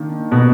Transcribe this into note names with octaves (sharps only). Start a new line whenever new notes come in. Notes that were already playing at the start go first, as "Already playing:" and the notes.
Already playing: D#3 A#3 D4
B2